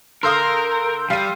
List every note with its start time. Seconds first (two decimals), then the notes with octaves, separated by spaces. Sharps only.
0.23 D3 A#4 F5 C6 D#6 E6 G6
1.10 G3 F5 D#7